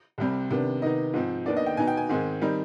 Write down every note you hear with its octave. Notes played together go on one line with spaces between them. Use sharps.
C2 C3 G3 C4
C3 D#3 B3 D4
C3 D#3 B3 D#4 D#5
G#2 F3 C4
D#2 D#3 B3 D4 D5
D#5
G5
B2 B3 D#4 G#5
G5
G#5
G#2 D#3 G#3 C4
D#3 G3 C4 D#4